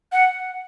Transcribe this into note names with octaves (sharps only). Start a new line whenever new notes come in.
F#5